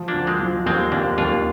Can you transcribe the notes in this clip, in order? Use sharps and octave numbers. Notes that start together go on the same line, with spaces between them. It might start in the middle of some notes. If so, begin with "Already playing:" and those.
Already playing: F3
A#3 D4
D2
G#3 C4
F3
D#2 G#3 C4
D#2 A#3 D4
D#2 D4 F4